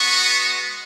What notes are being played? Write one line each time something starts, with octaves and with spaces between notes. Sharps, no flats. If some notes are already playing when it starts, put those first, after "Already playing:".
Already playing: G#3 B3 F#4 C#6